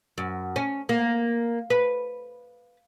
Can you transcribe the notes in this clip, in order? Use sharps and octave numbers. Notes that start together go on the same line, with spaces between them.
F#2
C#4
A#3
B4